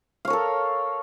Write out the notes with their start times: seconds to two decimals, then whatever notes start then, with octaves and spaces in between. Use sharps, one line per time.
0.25 F5
0.27 C#5
0.30 A#4
0.33 A4